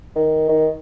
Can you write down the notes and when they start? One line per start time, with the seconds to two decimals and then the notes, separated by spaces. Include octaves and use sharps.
0.16 D#3
0.49 D#3